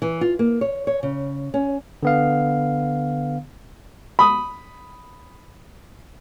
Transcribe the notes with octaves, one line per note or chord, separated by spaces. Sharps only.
E3
F4
A#3
C#5
C#5
C#3
C#4
D3 B3 F5
B5 D#6